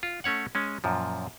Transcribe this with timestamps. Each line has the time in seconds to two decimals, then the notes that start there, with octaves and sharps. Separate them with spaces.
0.03 F4
0.24 A3 C#4 C#5 F#5
0.55 G#3 C#4
0.84 F#2 A#2 F3